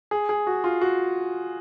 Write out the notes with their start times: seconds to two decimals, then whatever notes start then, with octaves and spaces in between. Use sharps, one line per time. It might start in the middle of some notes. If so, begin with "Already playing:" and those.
0.11 G#4
0.29 G#4
0.47 F#4
0.64 F4
0.81 F#4